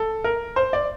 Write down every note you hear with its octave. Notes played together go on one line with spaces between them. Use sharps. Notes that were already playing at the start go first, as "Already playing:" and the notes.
Already playing: A4
A#4
C5
D5